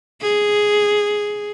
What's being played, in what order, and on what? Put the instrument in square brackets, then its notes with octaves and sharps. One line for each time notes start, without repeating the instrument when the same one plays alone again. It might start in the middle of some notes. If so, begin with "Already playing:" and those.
[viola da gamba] G#4